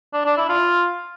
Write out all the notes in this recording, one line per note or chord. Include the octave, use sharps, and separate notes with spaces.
D4
D4
E4
F4